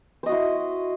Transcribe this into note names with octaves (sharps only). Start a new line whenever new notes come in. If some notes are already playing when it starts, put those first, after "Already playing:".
E4 F#4 C5 D#5